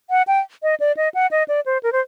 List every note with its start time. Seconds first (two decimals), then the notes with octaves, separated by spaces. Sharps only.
0.10 F#5
0.27 G5
0.63 D#5
0.80 D5
0.97 D#5
1.14 F#5
1.31 D#5
1.48 D5
1.66 C5
1.83 A#4
1.93 C5